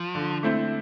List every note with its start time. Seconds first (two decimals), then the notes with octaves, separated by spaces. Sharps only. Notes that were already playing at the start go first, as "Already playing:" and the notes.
Already playing: F3
0.15 D3
0.43 A3 C4 E4